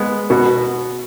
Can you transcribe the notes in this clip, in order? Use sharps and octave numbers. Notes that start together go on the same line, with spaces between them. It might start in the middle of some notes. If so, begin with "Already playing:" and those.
Already playing: G#3 B3
B2 B3 F#4